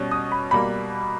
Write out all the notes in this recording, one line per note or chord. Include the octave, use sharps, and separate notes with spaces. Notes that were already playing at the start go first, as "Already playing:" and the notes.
Already playing: B2 G3 C#4
D#6
B5
B2 G3 A#3 B5